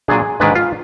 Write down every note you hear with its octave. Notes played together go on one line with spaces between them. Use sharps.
A#2 F#3 D4 G#4
G#2 D#3 G#3 D4 B4
F4